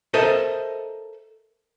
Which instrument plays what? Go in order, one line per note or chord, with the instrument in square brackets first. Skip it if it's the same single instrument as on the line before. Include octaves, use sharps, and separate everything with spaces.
[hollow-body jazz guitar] A4 A#4 C5 D#5 E5